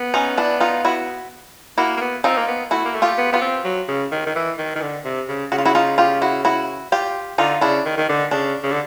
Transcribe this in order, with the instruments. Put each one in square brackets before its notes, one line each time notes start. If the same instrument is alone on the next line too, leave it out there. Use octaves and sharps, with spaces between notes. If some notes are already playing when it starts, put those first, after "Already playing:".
Already playing: [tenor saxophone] B3
[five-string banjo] C#4 D#4
D4 E4
D#4 F4
E4 F#4
[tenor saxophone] A#3 [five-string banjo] E4 F#4
[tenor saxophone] A#3
B3
[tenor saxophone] C4 [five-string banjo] D#4 F4
[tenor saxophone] A#3
B3
[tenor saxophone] A3 [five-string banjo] E4 F#4
[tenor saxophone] A#3
A3
[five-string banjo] F4 G4
[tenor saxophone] B3
[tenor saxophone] B3 [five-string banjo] F4 G4
[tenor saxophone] C4
F#3
C#3
D#3
D#3
E3
D#3
D#3
D3
C3
C#3
[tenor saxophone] C#3 [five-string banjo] F#4
[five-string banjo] F4
E4 F#4
D#4 F4
F4 G4
E4 F#4
E4 F#4
F4 G4
[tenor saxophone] D3 [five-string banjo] D#4 F4
[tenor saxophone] C#3 [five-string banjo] D4 E4
[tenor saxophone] D#3
D#3
D3
[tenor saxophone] C#3 [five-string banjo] D4
[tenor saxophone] C#3
D3